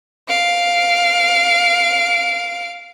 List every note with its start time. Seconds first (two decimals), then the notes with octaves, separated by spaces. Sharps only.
0.28 F5 D7